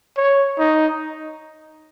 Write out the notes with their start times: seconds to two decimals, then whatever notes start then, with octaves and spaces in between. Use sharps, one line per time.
0.17 C#5
0.59 D#4